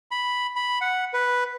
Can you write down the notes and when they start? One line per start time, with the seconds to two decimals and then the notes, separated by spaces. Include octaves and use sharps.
0.11 B5
0.56 B5
0.81 F#5
1.14 B4